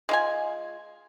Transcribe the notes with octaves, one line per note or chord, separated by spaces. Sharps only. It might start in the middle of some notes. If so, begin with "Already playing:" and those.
G#3 F4 G#5